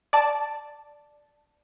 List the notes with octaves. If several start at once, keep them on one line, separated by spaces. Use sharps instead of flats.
D5 A5